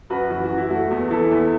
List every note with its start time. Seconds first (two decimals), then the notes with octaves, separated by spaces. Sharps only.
0.10 F#2 F#4 B4
0.30 E3 F#4
0.44 F#4
0.50 F#2
0.57 E4
0.70 A3 F#4
0.91 E2
1.10 E3 E4 A4
1.31 E2